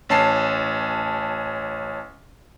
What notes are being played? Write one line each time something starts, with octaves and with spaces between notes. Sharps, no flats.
A1 C#4 A5 C7